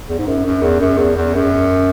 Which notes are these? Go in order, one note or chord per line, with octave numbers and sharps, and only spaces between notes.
E2
G#2
F#2
F#2
E2
F#2
E2
E2
F#2